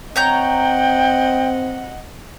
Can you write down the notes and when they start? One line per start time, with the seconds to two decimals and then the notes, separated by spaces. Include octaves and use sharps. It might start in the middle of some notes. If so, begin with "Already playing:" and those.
0.16 C4 C#5 D#5 F#5 G5 A#5 G6